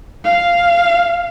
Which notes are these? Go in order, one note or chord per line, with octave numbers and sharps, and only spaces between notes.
F5